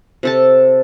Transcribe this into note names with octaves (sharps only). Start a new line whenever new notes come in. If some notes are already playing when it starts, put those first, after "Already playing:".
C3 A4 A5